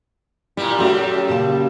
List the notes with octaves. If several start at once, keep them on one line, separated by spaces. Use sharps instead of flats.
A#2 G3 E4
F#2 G3 A3 F#4 A4
A#2 C#3 A5